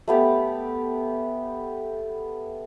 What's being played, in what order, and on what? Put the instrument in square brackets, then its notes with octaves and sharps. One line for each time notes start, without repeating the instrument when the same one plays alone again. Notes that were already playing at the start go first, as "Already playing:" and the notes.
[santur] A3 B3 G4